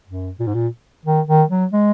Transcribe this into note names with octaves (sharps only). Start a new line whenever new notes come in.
F#2
A#2
G#2
A#2
D#3
D#3
F#3
G#3